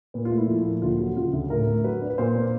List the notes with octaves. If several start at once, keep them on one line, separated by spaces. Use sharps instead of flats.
A#2 B4
F4
A3
E4
F3
A#2
D2 F4
F#3
C#3 F4
D2
A2 A#4
A3
F#3 B4
D4
B4
A#2 C5
A#3